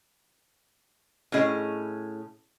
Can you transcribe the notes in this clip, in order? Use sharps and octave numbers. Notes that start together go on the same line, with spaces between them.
A2 C#4 G#4 D#5